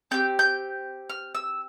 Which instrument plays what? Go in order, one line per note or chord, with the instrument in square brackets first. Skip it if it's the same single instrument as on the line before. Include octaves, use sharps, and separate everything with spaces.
[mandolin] C4 G4 G6
G6
F6
E6